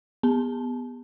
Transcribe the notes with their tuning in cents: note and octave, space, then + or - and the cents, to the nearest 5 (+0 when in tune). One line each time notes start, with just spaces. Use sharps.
B3 -5 A5 -35